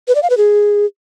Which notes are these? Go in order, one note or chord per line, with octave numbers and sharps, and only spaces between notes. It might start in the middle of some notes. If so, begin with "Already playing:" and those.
B4
D5
F5
B4
G#4